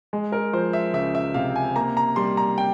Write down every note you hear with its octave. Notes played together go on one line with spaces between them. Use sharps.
G#3
A#4
F3 C5
E5
C#2 E5
E5
C3 F5
G#5
A#3 A#5
A#5
G3 C6
A#5
G5